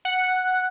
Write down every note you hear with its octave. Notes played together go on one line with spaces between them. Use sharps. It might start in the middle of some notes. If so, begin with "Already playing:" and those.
F#5